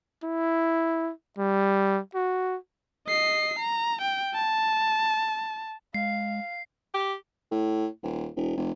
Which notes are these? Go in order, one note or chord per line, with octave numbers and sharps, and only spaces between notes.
E4
G3
F#4
D#5 C7
A#5
G5
A5
G#3 F5 C7
G4
A2
D#1
E1
F1